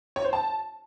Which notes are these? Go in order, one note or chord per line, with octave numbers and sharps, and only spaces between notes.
C#5
C5
A5